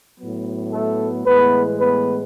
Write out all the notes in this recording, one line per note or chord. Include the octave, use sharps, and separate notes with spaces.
A2 F#3 B3
A3 A4
A2 E3 G#3 B3 B4
B3 B4